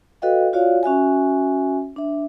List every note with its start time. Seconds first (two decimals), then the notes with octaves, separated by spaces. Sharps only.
0.22 F#4 A4 B4 D#5 F5 G5
0.53 F4 F#4 C#5 D5 F5
0.83 C#4 F#4 E5 G#5
1.96 D4 E5